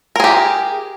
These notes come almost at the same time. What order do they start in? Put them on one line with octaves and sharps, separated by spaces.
A#4 G#4 G4